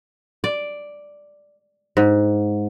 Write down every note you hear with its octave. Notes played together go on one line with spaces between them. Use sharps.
D5
G#2